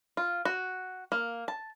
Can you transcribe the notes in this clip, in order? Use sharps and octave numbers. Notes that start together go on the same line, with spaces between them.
F4
F#4
A#3
A5